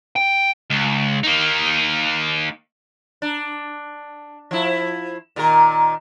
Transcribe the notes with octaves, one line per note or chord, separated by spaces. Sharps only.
G5
C#2
A#3 D#4
D4
F3 E4
A#2 D#3 A#4